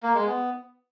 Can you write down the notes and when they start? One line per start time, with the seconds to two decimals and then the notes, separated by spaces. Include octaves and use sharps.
0.03 A#3
0.14 G#3
0.26 B3